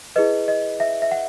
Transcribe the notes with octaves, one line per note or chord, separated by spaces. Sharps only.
E4 G#4 B4 D#5
D#5
E5
E5
F#5